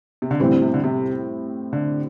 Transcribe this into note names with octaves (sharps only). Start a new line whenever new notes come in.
C3
D3
A2 E3 G3 C4 E4
D3
C3
D3
C3
D3